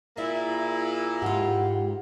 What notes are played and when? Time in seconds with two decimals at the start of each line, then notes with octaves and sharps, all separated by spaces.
0.17 A#2 A#3 E4 G#4 D5 E5
1.22 G#2 F4 G4 F#5